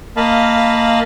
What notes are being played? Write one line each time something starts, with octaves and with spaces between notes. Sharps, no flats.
A#3 D#5 F5 A5 B5